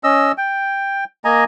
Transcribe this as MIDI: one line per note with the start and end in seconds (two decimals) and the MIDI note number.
0.04 0.32 61
0.04 0.32 75
0.04 0.32 88
0.38 1.04 79
1.25 1.44 58
1.25 1.44 75
1.25 1.44 80
1.25 1.44 82